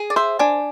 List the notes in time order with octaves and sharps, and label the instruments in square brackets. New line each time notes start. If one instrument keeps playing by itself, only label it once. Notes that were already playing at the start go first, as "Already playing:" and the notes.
Already playing: [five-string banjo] G#4
[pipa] D5
[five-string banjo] C5 [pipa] E5
[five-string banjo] D4 [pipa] G#5